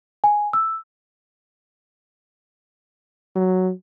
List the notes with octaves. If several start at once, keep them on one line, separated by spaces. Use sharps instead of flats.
G#5
E6
F#3